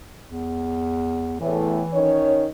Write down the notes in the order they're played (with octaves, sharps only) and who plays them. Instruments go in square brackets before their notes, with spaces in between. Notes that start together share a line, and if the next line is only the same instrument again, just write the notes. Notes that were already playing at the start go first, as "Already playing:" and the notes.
[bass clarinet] E2
[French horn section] E2 A2 [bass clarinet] E3
[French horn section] D#3 C#4 C#5